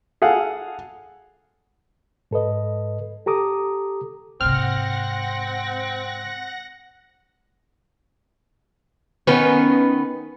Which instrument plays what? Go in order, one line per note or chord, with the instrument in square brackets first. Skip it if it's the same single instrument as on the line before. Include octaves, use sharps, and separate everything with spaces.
[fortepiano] G#4 A4 F5 F#5
[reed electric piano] G#2 A4 B4 D#5
G4 A4 A#5 D6 D#6
[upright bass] G#2 C3 [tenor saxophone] C4 [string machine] F#5 A#6 [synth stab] F6
[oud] D#3 B3 C#4